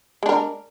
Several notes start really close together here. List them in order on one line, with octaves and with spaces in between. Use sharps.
G#3 D4 A#4